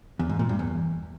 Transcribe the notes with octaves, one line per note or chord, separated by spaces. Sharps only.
E2
G#2
A#2
G2
E2